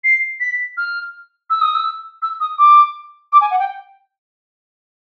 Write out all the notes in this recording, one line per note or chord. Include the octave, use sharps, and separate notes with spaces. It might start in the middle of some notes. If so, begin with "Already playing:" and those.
C7
B6
F6
E6
D#6
E6
E6
D#6
D6
D6
G#5
F#5
G5